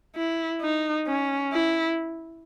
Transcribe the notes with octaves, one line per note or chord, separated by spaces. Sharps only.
E4
D#4
C#4
E4